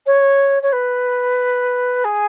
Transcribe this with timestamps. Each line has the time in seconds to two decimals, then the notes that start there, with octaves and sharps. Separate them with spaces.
0.06 C#5
0.62 C#5
0.72 B4
2.04 G#4